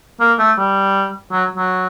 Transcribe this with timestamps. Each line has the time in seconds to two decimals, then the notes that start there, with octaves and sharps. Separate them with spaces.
0.20 A#3
0.39 A3
0.58 G3
1.32 F#3
1.56 F#3